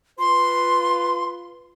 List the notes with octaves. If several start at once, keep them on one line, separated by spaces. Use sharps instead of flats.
F4 B4 C6